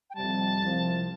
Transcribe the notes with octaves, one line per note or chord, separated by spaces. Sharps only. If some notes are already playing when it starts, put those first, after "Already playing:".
G5
F2 C3 G3 A5
C2 C3 F3